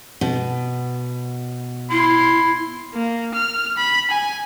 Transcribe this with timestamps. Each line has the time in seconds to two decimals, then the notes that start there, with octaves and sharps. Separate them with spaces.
0.21 B2
1.91 E4 C6
2.94 A#3
3.35 F6
3.78 B5
4.11 G#5